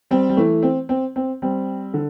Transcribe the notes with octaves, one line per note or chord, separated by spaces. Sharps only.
G3 C4
G3
E3 A3
C4
C4
C4
G3 C4
D3